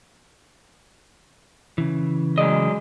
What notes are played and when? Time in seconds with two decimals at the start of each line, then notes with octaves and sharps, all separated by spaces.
1.78 C#3 E3
2.38 F#3 G#3 D5 D#5